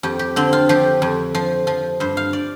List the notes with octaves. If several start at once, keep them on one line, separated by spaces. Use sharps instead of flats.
F2 G4
G4
D3 C4
F4
F3 G4
F2
F3
F3
G2 C5
F5
D5